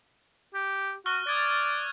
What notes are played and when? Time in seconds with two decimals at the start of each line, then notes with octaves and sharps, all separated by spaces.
0.54 G4
1.06 F#4 C#6 F6 F#6
1.27 D5 D#6 G#6 A6